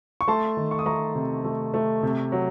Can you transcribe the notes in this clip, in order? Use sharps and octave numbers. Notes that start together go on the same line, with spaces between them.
C#6
A3 A5 C6
D#3
C#6
D#6
A3 A#5 C#6
C3
A3
A3
C3
F#3